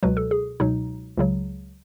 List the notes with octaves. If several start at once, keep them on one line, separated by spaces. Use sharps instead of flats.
C#2 B2 F#3 B4
A4
G#4
C#2 B2 F#3 D#4
C#2 C#3 F#3